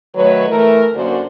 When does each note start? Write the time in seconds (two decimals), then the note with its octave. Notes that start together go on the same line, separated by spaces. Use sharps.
0.15 D#3 F#3 A3 B4 C#5
0.49 E3 A3 A#4
0.94 F#2 D3 A#3 F#4 C5 D5